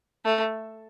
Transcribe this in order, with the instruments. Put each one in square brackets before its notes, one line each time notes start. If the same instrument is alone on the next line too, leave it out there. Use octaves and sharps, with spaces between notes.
[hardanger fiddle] A3